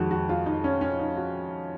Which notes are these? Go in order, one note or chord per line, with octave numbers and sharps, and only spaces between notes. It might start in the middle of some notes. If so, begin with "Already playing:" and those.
Already playing: F2 D#3 G#3 F#4
F#4
F4
D#4
C#4
C#4
D#4
F#4